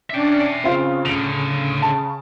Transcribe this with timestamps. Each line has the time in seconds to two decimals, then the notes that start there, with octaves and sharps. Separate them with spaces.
0.10 C#4 D4 D5 E5 G5
0.64 C#3 C4 F4 F5
1.05 A2 D3 D7 F7
1.82 A5